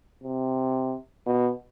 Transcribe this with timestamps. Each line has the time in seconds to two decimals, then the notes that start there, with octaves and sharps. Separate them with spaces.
0.23 C3
1.26 B2